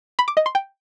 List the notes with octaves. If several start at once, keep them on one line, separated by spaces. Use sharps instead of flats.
B5
D6
D#5
C6
G5